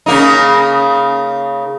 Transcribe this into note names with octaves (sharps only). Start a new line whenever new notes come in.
C#3 A#3 D#4